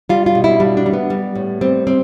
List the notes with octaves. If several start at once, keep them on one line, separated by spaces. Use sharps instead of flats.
G3 F4
F4
B2
E4
G3 D4
D4
G3
B3
G3
A2
G3 C4
G3 C4